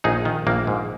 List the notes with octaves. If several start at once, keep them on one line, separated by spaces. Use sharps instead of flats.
A#1 D#4 G#4
D#3
A#1 A#3
G#2